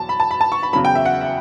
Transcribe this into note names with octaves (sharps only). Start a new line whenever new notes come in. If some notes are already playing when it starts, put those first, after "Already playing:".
Already playing: E2 B2 F#3 A5
B5
A5
B5
A5
C#6
B5
E2 C#3 F#3 B5
G5
E5
F#5
E5